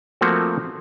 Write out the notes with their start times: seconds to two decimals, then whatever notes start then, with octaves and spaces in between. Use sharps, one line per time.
0.21 F3 A3 A#3 C4 F#4